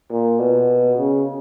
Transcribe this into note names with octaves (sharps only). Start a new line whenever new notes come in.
A#2
B2
C#3